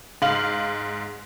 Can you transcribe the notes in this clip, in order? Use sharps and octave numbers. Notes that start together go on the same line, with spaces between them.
G#2 F5 F#7